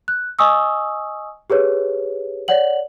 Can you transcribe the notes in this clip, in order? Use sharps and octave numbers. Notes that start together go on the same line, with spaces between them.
F#6
D#5 G#5 C#6 D#6 E6
G4 G#4 B4 C#5
C#5 D5 F#5 F#7